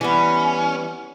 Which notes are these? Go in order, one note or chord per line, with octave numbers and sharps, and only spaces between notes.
E3 G3 B3 C#4